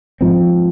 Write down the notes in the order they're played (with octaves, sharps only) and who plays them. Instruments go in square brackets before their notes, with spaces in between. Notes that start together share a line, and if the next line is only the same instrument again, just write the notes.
[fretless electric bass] G#2 F3 C4